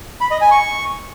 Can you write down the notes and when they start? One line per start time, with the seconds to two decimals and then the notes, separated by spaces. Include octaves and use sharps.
0.21 B5
0.31 D#5
0.41 G#5
0.51 C#6